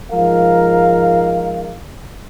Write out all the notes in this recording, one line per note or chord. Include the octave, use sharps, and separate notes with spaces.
G#2 F3 G#3 A#4 F5